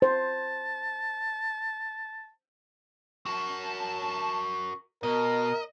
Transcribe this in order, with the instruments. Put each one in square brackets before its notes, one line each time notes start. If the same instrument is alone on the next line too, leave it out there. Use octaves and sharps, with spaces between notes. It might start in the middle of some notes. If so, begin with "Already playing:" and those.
[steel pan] C5 [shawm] A5
[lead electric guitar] F#4 A#4 [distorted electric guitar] A5
[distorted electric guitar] B2 [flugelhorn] A#4 [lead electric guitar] D#5